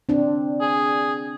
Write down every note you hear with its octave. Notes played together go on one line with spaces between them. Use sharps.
C4 D4
G#4